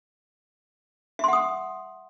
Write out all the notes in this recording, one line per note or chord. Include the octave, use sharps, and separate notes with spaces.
E5 F#5 C6 D#6